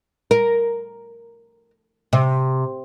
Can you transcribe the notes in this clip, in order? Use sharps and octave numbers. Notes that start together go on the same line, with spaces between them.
A#4
C3